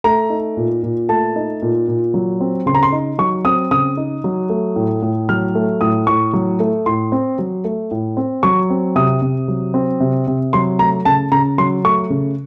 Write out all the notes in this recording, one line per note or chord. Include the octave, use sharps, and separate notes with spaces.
A3 A#5
D#4
A#2
A#2
A3 A5
D#4
A#2
A#2
F#3
C4
C#3 C6
A#5
C6
D#4
F#3 C#6
C4 D#6
C#3 D#6
D#4
F#3
A3
A2
A2
F#3 F6
A3
A2 D#6
A2 C#6
F#3
A3
A2 C6
C4
F#3
A3
A2
C4
F#3 C#6
C4
C3 D#6
C3
F#3
C4
C3
C3
F#3 C6
A3 A#5
C#3 A5
C#3 A#5
F#3 C6
A3 C#6
C#3